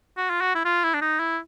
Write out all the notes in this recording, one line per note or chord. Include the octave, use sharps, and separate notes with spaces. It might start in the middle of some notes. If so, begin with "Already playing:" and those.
F#4
F4
F#4
E4
F4
E4
D4
D#4
E4